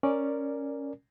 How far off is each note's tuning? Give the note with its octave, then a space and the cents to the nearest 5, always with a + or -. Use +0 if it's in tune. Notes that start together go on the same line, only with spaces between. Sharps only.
C#4 +0 A#4 +0 D5 +0